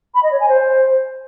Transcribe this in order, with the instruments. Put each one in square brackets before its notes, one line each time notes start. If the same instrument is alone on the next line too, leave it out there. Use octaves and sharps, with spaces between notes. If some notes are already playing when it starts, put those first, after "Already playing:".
[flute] B5
D#5
C#5
G#5
C5